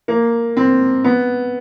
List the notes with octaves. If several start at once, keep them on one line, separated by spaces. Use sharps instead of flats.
A#3
C4
B3